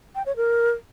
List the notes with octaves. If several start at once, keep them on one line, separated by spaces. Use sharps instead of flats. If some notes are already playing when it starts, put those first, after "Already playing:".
G5
C#5
A#4